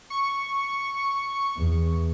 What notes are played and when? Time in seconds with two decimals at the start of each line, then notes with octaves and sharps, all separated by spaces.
0.10 C#6
1.58 E2